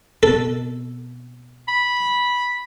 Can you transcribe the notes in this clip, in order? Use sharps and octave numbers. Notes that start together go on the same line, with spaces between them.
B2 B3 C4 A4
B5